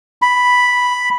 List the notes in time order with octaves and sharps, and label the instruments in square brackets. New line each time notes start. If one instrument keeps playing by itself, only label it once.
[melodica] B5